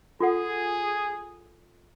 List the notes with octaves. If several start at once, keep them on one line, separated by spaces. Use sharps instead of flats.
F4 G#4 A4 F#5